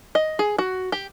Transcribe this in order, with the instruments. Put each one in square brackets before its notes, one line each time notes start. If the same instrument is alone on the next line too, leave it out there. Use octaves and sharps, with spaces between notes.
[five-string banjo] D#5
G#4
F#4
G4